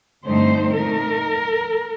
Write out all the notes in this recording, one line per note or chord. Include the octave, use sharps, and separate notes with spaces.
G2 D3 A3 C4 D#4 C5
A#2 A3 D#4 A#4